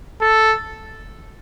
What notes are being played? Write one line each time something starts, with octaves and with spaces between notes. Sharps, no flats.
A4